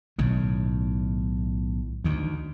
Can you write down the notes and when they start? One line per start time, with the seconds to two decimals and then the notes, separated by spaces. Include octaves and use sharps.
0.18 B1 A2 D#3
2.04 D2 D#3